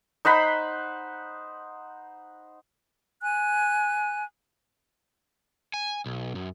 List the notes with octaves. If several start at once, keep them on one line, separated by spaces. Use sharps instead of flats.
D#4 C5 F#5 B5
G#5 F#6
G#5
B1
F#2